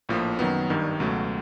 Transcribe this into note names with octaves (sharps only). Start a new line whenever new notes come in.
A#1 A2 F3 A#3
F#2 D#3 F#3 B3
G#1 G2 D#3 G3
C#2 B2 F#3 A3